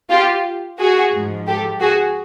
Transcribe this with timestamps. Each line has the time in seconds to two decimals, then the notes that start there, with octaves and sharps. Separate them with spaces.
0.10 F4 G4
0.79 F#4 G#4
1.12 G#2 F3
1.47 G4 A4
1.81 F#4 G#4